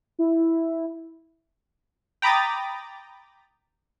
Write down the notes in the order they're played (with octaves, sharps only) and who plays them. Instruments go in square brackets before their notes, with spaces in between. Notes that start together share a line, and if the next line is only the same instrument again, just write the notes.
[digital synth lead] E4
[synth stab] G5 A#5 B5 D6 D#6 A6